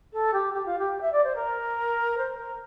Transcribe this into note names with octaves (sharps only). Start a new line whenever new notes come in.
A4
G4
G4
F4
G4
E5
D5
C5
A#4
C5
A#4